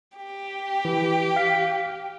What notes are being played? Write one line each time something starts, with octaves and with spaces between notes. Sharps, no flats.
G4
E3
F5 B6